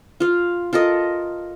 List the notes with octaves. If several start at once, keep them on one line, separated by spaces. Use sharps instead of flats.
F4 F5
F4 A4 A#4 D#5